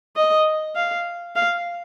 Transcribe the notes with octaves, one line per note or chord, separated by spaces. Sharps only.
D#5
F5
F5